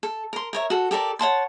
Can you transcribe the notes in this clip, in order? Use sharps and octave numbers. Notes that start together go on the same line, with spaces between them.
A4
A#4 C6
A#4 C#5 E5
F#4 A4
G4 A4 A#4 D5
C#5 F#5 A5 C6